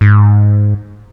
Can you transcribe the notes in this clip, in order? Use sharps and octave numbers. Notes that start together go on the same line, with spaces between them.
G#2